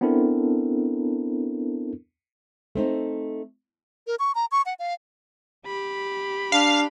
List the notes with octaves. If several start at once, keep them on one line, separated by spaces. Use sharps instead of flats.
B3 C4 D4 E4 A4 A#4
A3 C4 D#4
A#4
C#6
A#5
C#6
F#5
F5
G4 B5
D4 F5